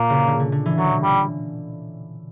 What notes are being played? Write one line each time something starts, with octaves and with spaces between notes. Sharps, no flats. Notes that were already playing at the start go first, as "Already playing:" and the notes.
Already playing: A#2 A#3
C#3
D3
D3
D3
E3
D3 F#3
B2
A#2 G3